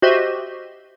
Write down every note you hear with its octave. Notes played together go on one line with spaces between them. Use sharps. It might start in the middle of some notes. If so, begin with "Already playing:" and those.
F#4 G4 C5 D#5 E5